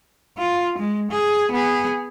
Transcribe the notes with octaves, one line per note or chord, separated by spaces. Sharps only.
F4
G#3
G#4
B3 G#4